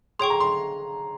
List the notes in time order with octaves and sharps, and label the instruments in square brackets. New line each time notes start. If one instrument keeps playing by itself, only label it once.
[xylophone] G#4 C#5 G5 C#6 [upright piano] C6
[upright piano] A#5
C6